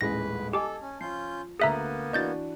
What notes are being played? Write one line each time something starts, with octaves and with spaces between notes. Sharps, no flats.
D#1 A1 G#3 B4 A#6
G4 A4 D#5 G#5 A5 D6
C#4
F3 C#4 F4 G6 C7
D2 A#3 B3 G#4 E5 A#5 F#6 D#7
E3 D4 F#4 D#5 G6 A6